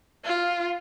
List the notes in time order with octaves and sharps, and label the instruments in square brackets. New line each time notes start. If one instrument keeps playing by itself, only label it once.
[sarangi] F4